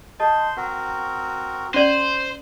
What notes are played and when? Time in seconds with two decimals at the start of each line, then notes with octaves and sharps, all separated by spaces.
0.20 C5 D#5 A5 C6 D#6
0.57 C4 F#4 A#4 F#5
1.74 C#4 C5 D5 D#7 F#7 G7